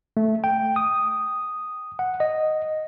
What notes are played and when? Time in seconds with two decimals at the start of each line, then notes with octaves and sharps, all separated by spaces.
0.17 A3
0.44 G5
0.76 D#6
1.99 F#5
2.20 D#5